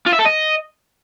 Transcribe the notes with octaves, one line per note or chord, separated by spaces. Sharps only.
F4
E5
A4
D#5